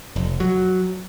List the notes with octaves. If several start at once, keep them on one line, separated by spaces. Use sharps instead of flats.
F1
F#3